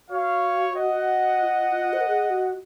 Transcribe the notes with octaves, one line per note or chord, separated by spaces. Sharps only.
F#4 C#5 F5
D#5 F#5
F4
F4
C5
A#4
G#4
F#4